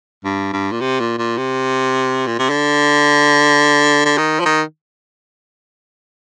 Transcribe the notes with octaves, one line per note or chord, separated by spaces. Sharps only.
G2
G2
A#2
C3
A#2
A#2
C3
A#2
C3
D3
D3
D#3
F3
D#3